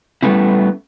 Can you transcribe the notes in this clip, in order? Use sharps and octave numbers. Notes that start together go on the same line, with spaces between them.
G3 A3 B3 C#4 E4